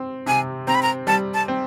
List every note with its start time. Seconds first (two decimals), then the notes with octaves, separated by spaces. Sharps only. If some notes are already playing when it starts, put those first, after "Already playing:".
Already playing: C4
0.26 C3 G#5
0.67 C4 A#5
0.75 B5
0.83 A#5
1.07 G3 A5
1.34 A5
1.48 C4